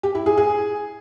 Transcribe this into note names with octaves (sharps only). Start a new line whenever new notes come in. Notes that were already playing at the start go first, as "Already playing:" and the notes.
G4
E4
G#4
G#4